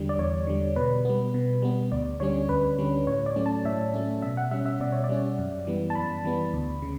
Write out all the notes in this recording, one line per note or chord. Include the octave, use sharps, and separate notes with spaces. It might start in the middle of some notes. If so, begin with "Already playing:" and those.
Already playing: E2 D3 G3
D5
E2 C#5
D3 G3
B2 B4
G3 B3
B2
G3 B3
D2 D5
D3 G3 C#4 C#5
D2 B4
D3 G3 C#4
A2 C#5
D5
F#3 A3 C#4
A5
A2 E5
F#3 A3 C#4
B2 E5
F#5
G3 C#4 E5
E5
B2 D5
C#5
D5
G3 C#4
F#2
E3 G3 B3
A5
F#2 B5
E3 G3 B3
D2
C#3